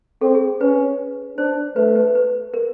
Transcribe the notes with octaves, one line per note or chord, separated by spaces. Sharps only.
C4 A4
G#4
C#4 B4
D4 C5
A3 B4
B4
B4
A#4